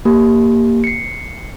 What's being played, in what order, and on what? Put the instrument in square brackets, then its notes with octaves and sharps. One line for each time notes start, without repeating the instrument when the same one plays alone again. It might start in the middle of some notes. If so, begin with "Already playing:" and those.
[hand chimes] A#3 G4
C7 C#7